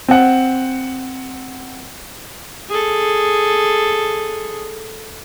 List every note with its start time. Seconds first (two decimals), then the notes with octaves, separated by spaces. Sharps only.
0.08 C4 F#5
2.69 G#4 A4